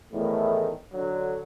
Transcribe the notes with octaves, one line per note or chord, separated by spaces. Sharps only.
E2 A2 D#3 A3
D3 F#3